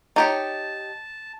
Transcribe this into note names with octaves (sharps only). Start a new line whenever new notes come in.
D#4 G4 C#5 A5